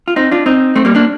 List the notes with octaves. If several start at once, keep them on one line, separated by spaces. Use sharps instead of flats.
F4
C4 D#4
D4 F4
C4 D#4
A3 C4
G3 A#3
A#3 D4